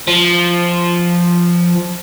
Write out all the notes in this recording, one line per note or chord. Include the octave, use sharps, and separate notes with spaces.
F3